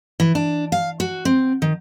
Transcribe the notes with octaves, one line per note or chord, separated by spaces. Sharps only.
E3
D4
F5
F#4
C4
D#3